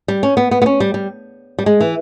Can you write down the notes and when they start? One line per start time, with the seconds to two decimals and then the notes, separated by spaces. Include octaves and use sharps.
0.08 G3
0.23 C#4
0.37 B3
0.51 B3
0.62 B3
0.66 C#4
0.80 G3
0.94 G3
1.59 G3
1.66 G#3
1.81 E3